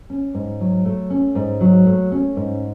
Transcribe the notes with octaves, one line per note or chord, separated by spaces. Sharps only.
C#4
G#2
F#3
A3
C#4
G#2
F#3
A3
C#4
G#2